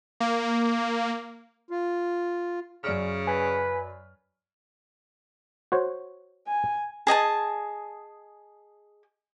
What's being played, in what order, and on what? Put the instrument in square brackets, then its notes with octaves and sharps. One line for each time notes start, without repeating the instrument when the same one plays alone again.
[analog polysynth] A#3
[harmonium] F4
[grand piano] F#2 D5 F6 [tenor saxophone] C#3
[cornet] B4 [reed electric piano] G#5
[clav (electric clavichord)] F#4 C5 C#5
[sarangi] G#5
[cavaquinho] G#4 D#5 G#5 A5